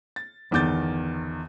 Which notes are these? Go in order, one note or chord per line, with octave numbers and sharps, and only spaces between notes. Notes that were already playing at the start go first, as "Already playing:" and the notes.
A6
G1 E2 D#3 D6 G6 A6